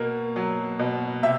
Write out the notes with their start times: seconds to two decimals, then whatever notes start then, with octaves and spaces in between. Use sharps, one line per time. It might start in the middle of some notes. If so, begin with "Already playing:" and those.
Already playing: B2 A#3
0.36 F#3
0.79 B2
1.23 C3 E5